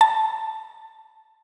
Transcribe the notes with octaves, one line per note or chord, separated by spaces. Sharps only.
A5